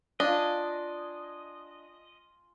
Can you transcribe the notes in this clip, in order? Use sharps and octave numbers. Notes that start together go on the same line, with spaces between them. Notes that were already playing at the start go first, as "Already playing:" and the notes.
D4 F4 D#5 G#5